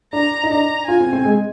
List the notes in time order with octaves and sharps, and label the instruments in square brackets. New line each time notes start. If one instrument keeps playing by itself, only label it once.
[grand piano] D4 [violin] A#5
[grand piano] D#4
[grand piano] D4 [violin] A#5
[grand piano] F4 [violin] G#5
[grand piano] C4
C4
G#3